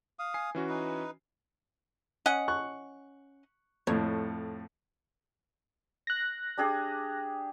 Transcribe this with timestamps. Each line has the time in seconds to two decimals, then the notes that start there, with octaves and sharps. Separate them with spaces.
0.19 F5 D#6
0.34 G#5 C7
0.55 E3 C#4 F#4
0.69 D#4 B4
2.26 C#4 D#5 F#5
2.48 C#6 F#6
3.87 F2 A2 C#5
6.07 F#6 A#6
6.58 D4 G4 G#4